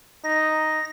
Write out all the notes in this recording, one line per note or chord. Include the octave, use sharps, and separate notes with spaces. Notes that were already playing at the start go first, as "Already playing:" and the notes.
D#4 A#6